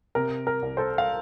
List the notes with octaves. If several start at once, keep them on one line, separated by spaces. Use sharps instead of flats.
C3 A#4
A#4
C2
A4 C5
F5